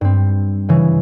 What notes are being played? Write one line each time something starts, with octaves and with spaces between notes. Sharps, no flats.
G2 C4
C#3 E3